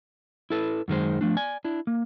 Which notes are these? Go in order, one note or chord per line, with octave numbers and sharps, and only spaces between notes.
E4 A4 B4
F#2 D#3 G#3 C5
F3 A3 D4
D5 G#5
D4 E4
A#3